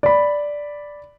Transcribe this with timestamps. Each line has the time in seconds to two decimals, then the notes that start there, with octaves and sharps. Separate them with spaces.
0.03 D5 B5